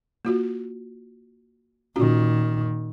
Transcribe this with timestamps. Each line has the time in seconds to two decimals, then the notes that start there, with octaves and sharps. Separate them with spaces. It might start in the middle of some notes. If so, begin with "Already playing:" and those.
0.25 A#3 F4 F#4
1.96 A#2 D#3 C#4 F4 F#4